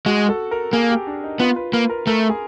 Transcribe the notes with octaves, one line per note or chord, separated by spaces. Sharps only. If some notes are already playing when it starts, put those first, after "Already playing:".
G#3 F#4
A4
A#4
A#3 G#4
G4
D4
D#4
B3 F4
B4
A#3 B4
A#4
A3 A#4
G#4